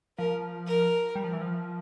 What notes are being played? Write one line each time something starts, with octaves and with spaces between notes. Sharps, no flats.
F3 A#4
A#4
G3
F3
E3
F3